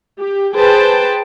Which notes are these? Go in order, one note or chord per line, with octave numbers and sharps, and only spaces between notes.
G4
G#4 B4 C5 G5 A5